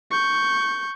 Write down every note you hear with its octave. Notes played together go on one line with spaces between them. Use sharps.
C#6 G6